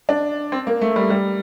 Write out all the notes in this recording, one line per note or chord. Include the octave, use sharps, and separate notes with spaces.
D4
C4
A#3
A3
G3
G3